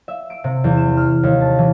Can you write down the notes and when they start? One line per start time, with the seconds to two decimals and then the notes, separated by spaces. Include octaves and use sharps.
0.08 E5
0.30 D7
0.44 C3
0.64 E2
0.77 E7
0.97 F6
1.23 D#2
1.41 A5
1.58 E3